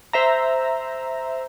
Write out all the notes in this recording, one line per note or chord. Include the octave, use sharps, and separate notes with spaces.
C5 E5 A#5